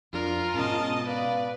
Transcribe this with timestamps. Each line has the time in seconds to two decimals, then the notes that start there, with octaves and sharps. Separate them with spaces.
0.13 F2 D4 F4 A#4
0.54 G#2 B2 C#4 D#5 A5
1.06 B4 D5 F5